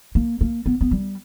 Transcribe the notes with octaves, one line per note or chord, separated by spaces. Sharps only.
A#3
A#3
B3
B3
G3